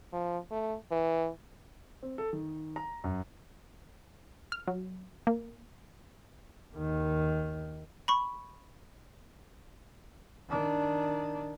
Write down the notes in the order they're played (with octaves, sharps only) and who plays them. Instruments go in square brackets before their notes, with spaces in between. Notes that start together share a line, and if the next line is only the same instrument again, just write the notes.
[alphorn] F3
A3
E3
[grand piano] C4
A4
D#3
A#5
F#2
[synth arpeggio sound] F6
F#3
A#3
[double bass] D#2 D#3
[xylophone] B5 C#6
[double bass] D#3 D4